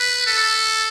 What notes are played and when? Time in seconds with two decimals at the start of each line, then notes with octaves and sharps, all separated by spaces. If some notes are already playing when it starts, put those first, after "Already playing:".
Already playing: B4
0.26 A4